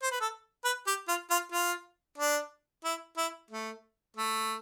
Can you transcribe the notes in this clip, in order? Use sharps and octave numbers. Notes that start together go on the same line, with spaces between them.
C5
B4
A4
B4
G4
F4
F4
F4
D4
E4
E4
A3
A3